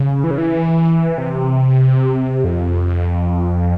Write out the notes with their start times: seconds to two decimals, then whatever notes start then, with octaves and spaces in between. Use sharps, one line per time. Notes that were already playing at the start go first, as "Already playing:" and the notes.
Already playing: C#3
0.24 E3
0.31 C#3
0.38 E3
1.18 C3
2.44 F2